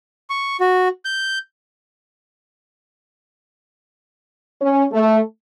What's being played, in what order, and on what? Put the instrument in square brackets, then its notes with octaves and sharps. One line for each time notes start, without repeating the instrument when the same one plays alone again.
[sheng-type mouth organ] C#6
F#4
G6
[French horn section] C#4
A3